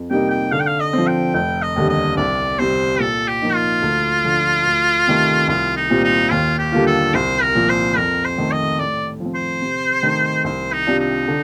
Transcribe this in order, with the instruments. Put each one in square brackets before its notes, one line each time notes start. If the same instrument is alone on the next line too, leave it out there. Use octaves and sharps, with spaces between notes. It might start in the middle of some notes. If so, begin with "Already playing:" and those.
Already playing: [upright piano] F2
[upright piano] C3 G3 A#3 D#4 [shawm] G5
[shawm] G5
[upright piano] D3 [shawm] F5
[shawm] G5
F5
D#5
[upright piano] F3 C4
[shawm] G5
[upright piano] F1 [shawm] G5
[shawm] D#5
[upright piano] D#2 D3 G3
[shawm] D#5
[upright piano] C2 [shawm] D5
[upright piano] C3 G3 C4 [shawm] C5
[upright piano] A#2 [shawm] A4
[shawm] G4
[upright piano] F3 A#3 D#4
[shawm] F4
[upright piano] D2
D3 F3
D2
C3 D#3 A3
[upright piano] C2 [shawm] F4
[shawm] D#4
[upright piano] A#2 G3 C4 F4
[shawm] D#4
[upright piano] D#2 [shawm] F4
[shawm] G4
[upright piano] D3 G3 A#3 F4
[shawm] A4
[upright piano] C2 [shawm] C5
[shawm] A#4
[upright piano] A#2 F3
[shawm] C5
[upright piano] F2 [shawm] A#4
[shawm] C5
[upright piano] D#3 A3
[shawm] D#5
[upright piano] A2 [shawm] D5
[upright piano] F3
C4
[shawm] C5
[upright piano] C3
D#3 A3 D#4
[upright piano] C2 [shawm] C5
[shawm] D#4
[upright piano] C3 G3 D4 F4
[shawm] D#4
[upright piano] D3